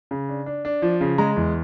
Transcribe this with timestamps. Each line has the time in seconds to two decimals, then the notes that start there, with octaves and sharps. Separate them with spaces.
0.11 C#3
0.29 D4
0.46 D4
0.65 D4
0.82 F3
1.01 C#3
1.18 G#3 A#5
1.36 E2